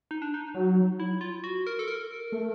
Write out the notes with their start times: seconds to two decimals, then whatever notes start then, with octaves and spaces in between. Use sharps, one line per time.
0.11 D#4
0.22 D4
0.34 D#4
0.54 F#3
1.00 E4
1.21 F4
1.44 F#4
1.67 A#4
1.79 A4
1.88 A#4
2.32 A3